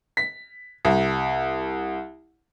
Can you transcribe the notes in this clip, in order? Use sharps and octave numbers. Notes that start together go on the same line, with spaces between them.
B6
C2